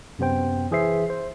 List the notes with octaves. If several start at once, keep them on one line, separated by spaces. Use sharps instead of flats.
F#2 C3 B3 C5 G5
E3 G#4 C5 E5 C7
C5